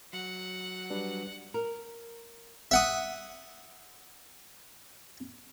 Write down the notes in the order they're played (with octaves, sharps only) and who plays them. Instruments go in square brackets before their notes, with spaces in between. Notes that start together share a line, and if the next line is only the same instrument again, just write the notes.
[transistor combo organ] F#3 [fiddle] F#5
[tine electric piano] G3 D4 B4
[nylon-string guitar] A#4
[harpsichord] E5 F#5 D#6